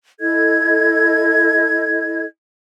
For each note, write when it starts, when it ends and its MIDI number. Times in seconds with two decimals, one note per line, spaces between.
0.20 2.24 64
0.20 2.24 69
0.20 2.24 75
0.20 2.24 92